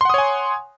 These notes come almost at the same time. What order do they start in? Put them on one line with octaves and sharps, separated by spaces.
C6 F#5 D#6 C#5 G#5